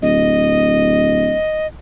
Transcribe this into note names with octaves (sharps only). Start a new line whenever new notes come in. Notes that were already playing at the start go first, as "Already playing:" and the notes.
D1 D#5